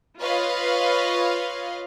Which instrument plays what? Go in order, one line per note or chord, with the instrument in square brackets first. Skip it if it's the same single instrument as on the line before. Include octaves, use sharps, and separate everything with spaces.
[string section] F4 B4 C#5 D#5 F5